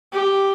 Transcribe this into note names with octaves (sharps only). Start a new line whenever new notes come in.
G4